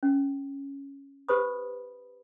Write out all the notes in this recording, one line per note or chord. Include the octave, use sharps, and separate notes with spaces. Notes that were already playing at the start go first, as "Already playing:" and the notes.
C#4
G4 B4 C5 B5 D#6